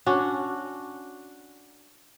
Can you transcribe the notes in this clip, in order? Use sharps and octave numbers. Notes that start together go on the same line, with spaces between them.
C#4 D4 F#4